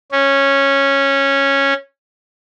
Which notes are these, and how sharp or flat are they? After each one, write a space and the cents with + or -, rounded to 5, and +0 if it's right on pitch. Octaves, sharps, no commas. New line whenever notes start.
C#4 -10